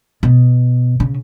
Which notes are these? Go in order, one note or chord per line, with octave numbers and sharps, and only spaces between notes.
B2
C#3